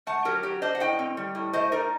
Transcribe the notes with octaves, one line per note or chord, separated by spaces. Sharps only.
A3 F#5 A5
F#3 G4 A#4
F#3 G4
D4 C5 D#5
F#5
A2 D#5 G5
C4
G3
A2
A3 C5 D#5
D#4 A#4 D5